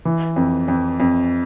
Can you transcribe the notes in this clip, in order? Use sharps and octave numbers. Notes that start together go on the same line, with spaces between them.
E3
F2
F2
F2